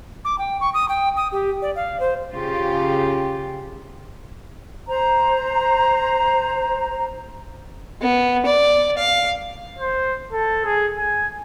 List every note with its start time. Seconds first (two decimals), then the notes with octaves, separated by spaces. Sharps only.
0.25 D6
0.38 G5
0.61 C#6
0.74 D#6
0.89 G5
1.17 D#6
1.32 G4
1.62 D5
1.76 F5
2.00 C5
2.34 C#3 F4 G4
4.87 C5 A#5
8.01 B3
8.46 D5
8.97 F5
9.78 C5
10.32 A4
10.65 G#4
10.98 G#5